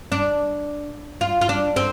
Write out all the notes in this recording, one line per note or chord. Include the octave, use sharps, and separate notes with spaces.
D4
F4
F4
D4
C4